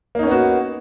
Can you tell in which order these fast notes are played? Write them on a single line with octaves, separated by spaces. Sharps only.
A#3 D#4 C#4 B3 F#4